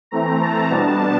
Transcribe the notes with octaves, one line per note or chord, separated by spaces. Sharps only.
E3 A3 C4 A#5
A5
B2 G3 B3 D4